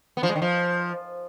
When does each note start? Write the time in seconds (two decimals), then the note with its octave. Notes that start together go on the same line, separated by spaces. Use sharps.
0.17 B3
0.23 F3
0.29 G#3
0.36 D#3
0.42 F3